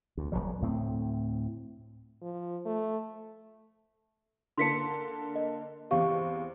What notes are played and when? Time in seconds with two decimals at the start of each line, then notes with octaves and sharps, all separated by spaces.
0.17 D2
0.32 D#1 G#1 F#3 G3
0.61 D2 A2 C4
2.22 F3
2.66 A3
4.58 D3 A#3 A5 C6 B6 C#7
5.35 D#5
5.91 E2 C4 G4 F5 C#6